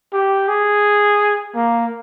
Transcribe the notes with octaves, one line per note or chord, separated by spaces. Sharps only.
G4
G#4
A#3